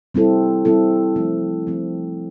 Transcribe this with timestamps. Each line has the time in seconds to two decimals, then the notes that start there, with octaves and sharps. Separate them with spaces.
0.15 G3 C4 E4 A4
0.65 G3 C4 E4 A4
1.16 F3 A3 C4
1.67 F3 A3 C4